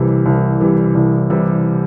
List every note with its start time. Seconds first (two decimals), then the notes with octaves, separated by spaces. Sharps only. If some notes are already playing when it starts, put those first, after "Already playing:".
Already playing: C2 C3 E3 G3
0.26 C2
0.60 C3 E3 G3
0.95 C2
1.30 C3 E3 G3